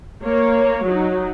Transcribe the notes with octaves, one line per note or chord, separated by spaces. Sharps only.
A#3 C#5
F#3 D#4